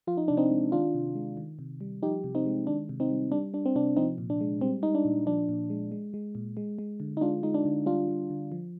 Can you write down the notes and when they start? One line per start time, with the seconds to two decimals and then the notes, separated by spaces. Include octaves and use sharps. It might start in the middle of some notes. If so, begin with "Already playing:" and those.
0.07 F3 F4
0.17 D#4
0.28 C3 D4
0.37 C4 D#4
0.51 G#3
0.72 D#3 D4 F4
0.94 C3
1.15 G#3
1.37 D#3
1.59 C3
1.81 G3
2.03 F3 D#4 G4
2.24 C3
2.35 C4 D#4
2.46 G#3
2.67 D#3 D4
2.89 C3
3.00 C4 D#4
3.10 G3
3.32 G3 D4
3.54 G3 D4
3.66 C4
3.76 C3 D4
3.97 F3 C4 D#4
4.18 A#2
4.30 D4
4.41 G#3
4.61 G3 C4
4.83 G3 D#4
4.95 D4
5.05 A#2
5.26 F3 D4
5.49 A#2
5.70 G#3
5.92 G#3
6.14 G#3
6.35 A#2
6.57 G#3
6.79 G#3
7.00 D3
7.17 D#4
7.21 G#3 D4 F4
7.43 G#3 D#4
7.54 D4
7.65 D3
7.86 G3 D4 F4
8.08 G3
8.30 D3
8.52 F3